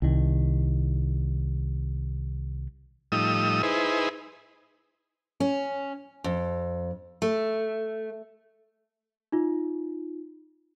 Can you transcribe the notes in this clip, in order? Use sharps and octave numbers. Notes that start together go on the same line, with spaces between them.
C2 D#3
A2 F3 G3 D#4 D#6 E6
D#4 E4 G#4 B4 C5
C#4
F2
A3
D#4 F4